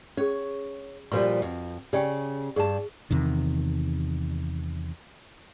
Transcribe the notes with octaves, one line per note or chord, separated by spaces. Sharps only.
C#4 G#4 C#5
A#2 F3 G3 F#4 B4 C#6
F2 F#5
C#3 G4 D5 G5
G2 G#4 A5
E2 C3 D#3